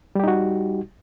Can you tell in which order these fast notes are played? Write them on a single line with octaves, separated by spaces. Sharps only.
G3 G4 D#4 F#4